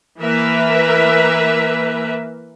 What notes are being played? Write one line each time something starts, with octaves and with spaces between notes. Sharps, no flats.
E3 A#3 A#4 B4 E5